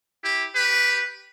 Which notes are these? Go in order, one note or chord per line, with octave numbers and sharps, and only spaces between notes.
E4 G4
G4 B4